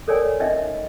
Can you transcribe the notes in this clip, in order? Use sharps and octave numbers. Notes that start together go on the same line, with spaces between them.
A4 A#4 C#5 D5 G5 G#5
C#4 D#4 D#5 E5 G5